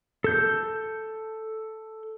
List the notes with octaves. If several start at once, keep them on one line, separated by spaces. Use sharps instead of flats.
A4 G6